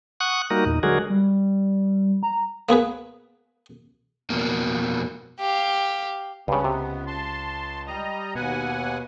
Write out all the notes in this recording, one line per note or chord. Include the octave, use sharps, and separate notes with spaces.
F#5 C#6 D#6 F#6
G3 A#3 D#4 F#4 A#4
E2 A#2 D#4
D3 F#3 G#3 F#4 G#4 A#4
G3
A#5
A#3 B3 G#4 B4
F2 B2 A#3
G4 F5
C#2 G2 C#3 B3
C3
A5 C6
G3 D#5 A#5
D#2 B2 F#5 G#5